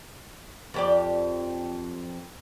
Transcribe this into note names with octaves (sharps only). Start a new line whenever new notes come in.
F2 G4 D5